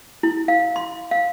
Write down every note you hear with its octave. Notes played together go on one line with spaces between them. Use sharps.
E4
F5
C6
F5